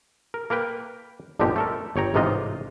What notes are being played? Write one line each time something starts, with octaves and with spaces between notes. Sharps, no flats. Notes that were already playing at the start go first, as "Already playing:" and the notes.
A#4
A#3 A#4 B4 G5
G1 F2 A#2 D3 D#4 G4
A3 A4 A#4
G1 C#5 G5 A#5
A1 G#2 C3 D#4 F4 D#5